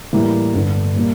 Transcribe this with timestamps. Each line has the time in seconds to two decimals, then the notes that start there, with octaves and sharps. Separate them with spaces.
0.13 A2 E3 G3 A#3
0.54 G1 G2 D3
0.96 A#2 G3 A#3